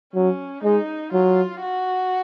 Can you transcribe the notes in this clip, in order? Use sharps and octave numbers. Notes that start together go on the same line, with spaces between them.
F#3 C#4
G#3 D#4
F#3 F4
F#4